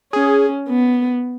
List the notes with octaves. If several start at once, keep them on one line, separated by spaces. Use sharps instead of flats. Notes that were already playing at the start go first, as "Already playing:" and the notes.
C#4 G#4
B3